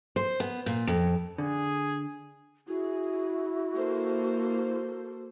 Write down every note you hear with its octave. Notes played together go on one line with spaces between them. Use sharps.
C5
B3
A#2
F2
D3 G#4
E4 F#4 G#4
A#3 A4 C5